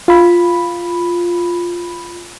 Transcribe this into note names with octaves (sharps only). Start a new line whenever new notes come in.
F4 B5